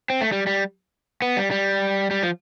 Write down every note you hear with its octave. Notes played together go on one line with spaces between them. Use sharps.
C4
A3
G3
G3
B3
G3
G3
G3
F3